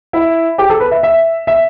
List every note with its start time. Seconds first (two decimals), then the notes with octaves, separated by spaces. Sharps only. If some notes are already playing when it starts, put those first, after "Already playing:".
0.13 E4
0.58 G4
0.70 A4
0.80 B4
0.91 E5
1.03 E5
1.47 E5